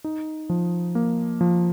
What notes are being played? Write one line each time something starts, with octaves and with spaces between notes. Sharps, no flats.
D#4
F3
A#3
F3